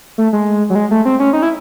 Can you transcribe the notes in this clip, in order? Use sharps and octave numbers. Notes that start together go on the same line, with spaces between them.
A3
G#3
F#3
G#3
A3
C4
C#4
D#4
E4